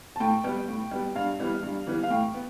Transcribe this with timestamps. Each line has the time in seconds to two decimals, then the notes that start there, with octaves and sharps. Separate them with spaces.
0.16 A5
0.20 A2 G5
0.44 G3 B3
0.68 A2
0.91 G3 B3
1.16 G2 F5
1.39 E3 G3 B3
1.63 G2
1.87 E3 G3 B3
2.03 F5
2.10 A2 G5
2.34 B3